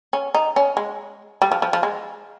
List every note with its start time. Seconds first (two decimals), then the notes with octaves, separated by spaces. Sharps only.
0.13 C#4
0.35 D#4
0.56 C#4
0.77 G#3
1.42 G3
1.52 F3
1.62 F3
1.73 F3
1.83 G#3